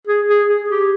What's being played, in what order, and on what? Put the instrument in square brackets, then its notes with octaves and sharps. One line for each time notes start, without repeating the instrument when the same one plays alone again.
[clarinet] G#4
G#4
G#4
G4